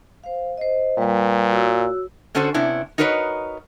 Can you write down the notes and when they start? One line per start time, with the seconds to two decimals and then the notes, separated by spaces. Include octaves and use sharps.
0.24 C5 F5
0.57 C5 D#5
0.98 A#2 G3 B4
1.52 F#4 C#5 E6
2.35 D3 C#4 D4 F#4 A4 C5
2.54 C3 B3 C#4 D4 E4
2.98 D#4 F#4 A#4 B4 C#5 D#5